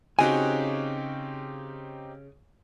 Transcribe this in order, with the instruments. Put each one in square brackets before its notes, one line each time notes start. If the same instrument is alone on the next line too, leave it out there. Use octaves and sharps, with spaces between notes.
[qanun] C#3 F#4 [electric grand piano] C4 D#4 G4 [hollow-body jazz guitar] G#5